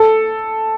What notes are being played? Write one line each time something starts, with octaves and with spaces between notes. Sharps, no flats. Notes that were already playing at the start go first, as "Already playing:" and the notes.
Already playing: A4